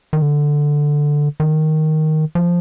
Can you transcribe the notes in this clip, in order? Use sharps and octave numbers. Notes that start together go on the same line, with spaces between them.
D#3
D3
D#3
F3